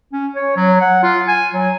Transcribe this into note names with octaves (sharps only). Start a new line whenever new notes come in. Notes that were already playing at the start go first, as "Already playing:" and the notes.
C#4
C#5
F#3
F#5
F4
G#5
F#3